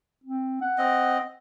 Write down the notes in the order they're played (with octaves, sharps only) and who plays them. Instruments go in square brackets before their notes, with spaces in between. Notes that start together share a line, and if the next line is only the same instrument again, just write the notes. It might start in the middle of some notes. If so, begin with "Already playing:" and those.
[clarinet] C4
F#5
[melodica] C4 D#5